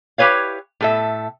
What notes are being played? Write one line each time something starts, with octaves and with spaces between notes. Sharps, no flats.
E4 G4 G#4 B4 C#5 F5
A2 A4 E5